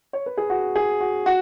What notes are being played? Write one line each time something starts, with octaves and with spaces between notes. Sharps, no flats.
C#5
B4
G#4
F#4
G#4
F#4
F#4